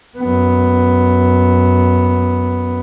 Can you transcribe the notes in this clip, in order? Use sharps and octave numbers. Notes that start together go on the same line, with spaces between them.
F#2 B3